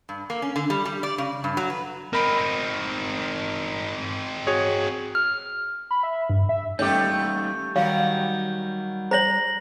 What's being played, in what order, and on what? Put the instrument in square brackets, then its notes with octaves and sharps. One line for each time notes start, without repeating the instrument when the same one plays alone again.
[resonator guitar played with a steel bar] G2
A#3
C#4
D3
G3
G3
D5
C#3
G2
F#3
B4
[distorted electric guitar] C4 D#4 [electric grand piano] A#4 B5
[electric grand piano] F#4 G#4 C#5
[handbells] F6
[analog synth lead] B5
E5
G2
E5
[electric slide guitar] G3 C#4 D#4 [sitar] A3 G4 [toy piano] C#5 [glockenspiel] G6
[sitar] D#3 F#3 F#4 [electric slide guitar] G3 [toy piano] C#5 F5
[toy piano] C5 C#5 [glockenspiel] A#5 A#6 F#7